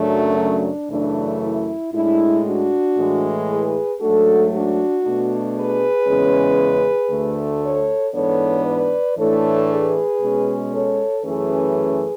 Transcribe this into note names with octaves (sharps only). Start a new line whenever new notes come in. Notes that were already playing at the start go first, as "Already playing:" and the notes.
Already playing: F#2 C#3 F#3 A3 D4
D4
F#2 C#3 E3 A3 D4
E4
A2 G#3 D4 E4
D4 F#4
A2 E3 G#3
G#4 B4
G#2 F#3 A3 D4 F#4 A4
D4 F#4
B2 A3 D4
G#4 B4
E2 C#3 G#3 C#4
D2 D3 A3
A4 C#5
G#2 E3 B3 D4 A4 C#5
B4 D5
A2 E3 A3 D4 A4 C#5
G#4 B4
B2 G#3 C#4
A4 C#5
F#2 E3 A3 C#4 G#4 B4